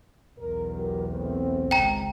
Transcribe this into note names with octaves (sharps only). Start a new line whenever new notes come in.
B1 E2 A#4
F#3 G4 A#4
A3 B3 C4
G#1 C#2 G5 A#5